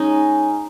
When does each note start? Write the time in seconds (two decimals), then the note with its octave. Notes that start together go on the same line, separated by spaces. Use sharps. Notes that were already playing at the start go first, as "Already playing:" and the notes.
Already playing: G#3 C#4 D#4